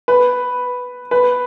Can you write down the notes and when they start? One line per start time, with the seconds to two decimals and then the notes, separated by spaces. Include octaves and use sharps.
0.08 B4
1.11 B4